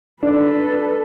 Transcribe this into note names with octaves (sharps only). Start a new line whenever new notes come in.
D4 A4 B4